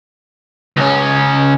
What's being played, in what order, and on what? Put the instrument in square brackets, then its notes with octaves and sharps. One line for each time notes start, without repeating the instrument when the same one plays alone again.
[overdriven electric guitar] C#2 C#4